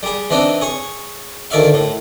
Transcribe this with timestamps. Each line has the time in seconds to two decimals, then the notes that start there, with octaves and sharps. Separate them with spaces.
0.03 G3 G#4
0.30 E3 C4 D4 D#4
0.61 G#4 C#5
1.51 D2 D#3 D5 E5 F5
1.74 A2